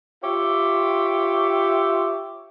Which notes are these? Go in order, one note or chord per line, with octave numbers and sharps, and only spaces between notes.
F4 G4 C#5 E5